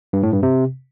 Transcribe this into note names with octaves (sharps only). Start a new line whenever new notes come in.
G2
A2
G2
C3